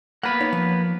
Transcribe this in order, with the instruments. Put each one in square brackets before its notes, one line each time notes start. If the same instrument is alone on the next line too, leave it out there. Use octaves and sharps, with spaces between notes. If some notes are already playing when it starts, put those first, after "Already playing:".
[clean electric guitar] A#3 B3 B4 [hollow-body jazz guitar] F#5 B5
[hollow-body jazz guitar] D#4 C#5
F3